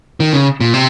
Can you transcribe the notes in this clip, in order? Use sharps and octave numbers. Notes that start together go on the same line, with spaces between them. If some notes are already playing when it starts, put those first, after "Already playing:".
D#3
C#3
A#2
C3